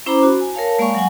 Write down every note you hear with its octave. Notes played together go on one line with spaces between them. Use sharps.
C#4 E4 C5 A#5 B5 D6
F#4
G#5
A#4 C#5 F5 A5
G#3 A#3 D5 F5 G#5 C#6
F#3 F#5 G#5